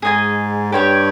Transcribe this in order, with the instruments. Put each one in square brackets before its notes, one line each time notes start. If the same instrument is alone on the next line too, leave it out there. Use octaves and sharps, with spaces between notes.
[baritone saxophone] G#2 [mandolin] G#4 D#5 G#5
[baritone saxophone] G2 [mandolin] G4 C#5 G5